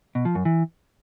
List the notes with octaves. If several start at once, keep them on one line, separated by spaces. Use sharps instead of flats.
B2
F3
F#2
E3